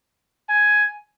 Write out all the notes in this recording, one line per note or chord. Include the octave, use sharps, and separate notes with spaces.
G#5